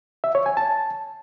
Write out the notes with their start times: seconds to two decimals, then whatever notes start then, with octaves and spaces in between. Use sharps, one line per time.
0.24 E5
0.35 C#5
0.46 G#5
0.57 A5